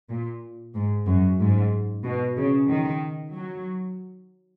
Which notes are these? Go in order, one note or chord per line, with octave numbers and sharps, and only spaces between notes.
A#2
G#2
F#2
G#2
B2
C#3
D#3
F#3